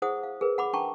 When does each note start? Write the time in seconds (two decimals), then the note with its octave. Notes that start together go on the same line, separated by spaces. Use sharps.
0.02 E4 G#4 C5 F#5 D#6
0.23 F5
0.41 G#4 A#4 B4
0.58 F#5 B5 D6
0.73 D4 G5 A5 A#5 C#6